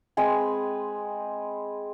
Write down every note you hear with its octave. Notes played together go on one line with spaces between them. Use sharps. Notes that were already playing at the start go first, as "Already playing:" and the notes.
G#3 C4 B4 G#5